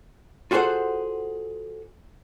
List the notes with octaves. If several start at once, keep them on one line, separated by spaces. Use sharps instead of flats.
F4 F#4 G#4 A4 C5 F#5